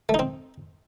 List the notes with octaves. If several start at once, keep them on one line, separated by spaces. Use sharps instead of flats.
A3
D#4
C4